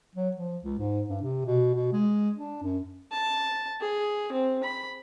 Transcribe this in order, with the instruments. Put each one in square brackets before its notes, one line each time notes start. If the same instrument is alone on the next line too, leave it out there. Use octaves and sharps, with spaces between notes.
[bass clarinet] F#3
F3
C#2
G#2
G2
C3
B2
B2
G#3
D4
F#2
[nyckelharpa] A5
G#4
C4
B5